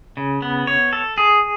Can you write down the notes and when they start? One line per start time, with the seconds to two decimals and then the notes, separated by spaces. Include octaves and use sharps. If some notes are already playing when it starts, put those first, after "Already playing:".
0.17 C#3
0.42 B3
0.67 C#5
0.93 A4
1.18 G#4